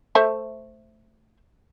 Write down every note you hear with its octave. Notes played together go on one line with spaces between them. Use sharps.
A3 C5 E5